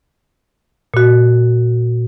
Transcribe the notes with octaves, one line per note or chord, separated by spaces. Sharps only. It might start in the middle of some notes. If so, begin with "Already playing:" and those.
A#2 F#4